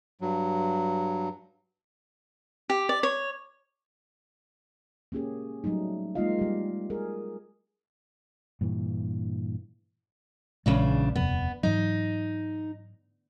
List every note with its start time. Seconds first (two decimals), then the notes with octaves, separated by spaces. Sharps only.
0.21 G2 F#3
2.70 G4
2.89 D5
3.03 C#5
5.12 A#3 C#4 G4 G#4
5.64 F#3 G3 A3 D#4
6.15 G#3 A#3 D#4 F4 D#5 F5
6.39 G3 G4
6.90 G#4 A#4
8.61 G2 A#2 E3
10.66 A#1 E2 A#2 C#3 G#3 D4
11.16 D#1 F2 C3 B3
11.63 G#2 E3 F#3 D#4